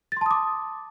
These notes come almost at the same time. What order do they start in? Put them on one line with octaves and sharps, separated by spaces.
A6 C6 A5 D#6 D6